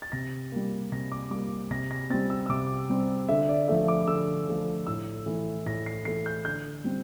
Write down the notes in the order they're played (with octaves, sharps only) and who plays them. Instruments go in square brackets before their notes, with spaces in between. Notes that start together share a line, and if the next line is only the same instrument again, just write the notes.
[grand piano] A6
C3 A#6
G3 A#3
C3 A#6
D6
G3 A#3 D6
C3 A#6
A#6
G3 C4 A6
E6
E6
C3 D6
G3 C4
D3 E5
D5
F3 A3 E5
D6
D3 E6
F3 A3
A2 E6
E3 A3
A2 A#6
C7
E3 A3 C7
G6
D3 G6
G3 C4